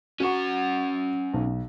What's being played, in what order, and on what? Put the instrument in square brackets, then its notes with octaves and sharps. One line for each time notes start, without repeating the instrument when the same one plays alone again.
[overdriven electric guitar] C#4 F#5 [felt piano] F#4 C#6
[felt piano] B1